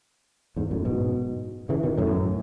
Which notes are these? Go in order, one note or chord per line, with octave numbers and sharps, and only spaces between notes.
E2 G#2
F#2 A2
G#2 B2
C#3 E3
B2 D#3
F#2 A2